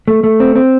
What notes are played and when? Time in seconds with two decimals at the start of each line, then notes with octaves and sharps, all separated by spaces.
0.08 A3
0.24 A3
0.40 C4
0.55 C4